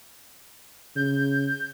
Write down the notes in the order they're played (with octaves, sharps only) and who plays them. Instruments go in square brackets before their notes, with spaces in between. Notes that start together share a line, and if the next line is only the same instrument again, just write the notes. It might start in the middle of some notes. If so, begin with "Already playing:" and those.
[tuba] C#3 [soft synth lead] G6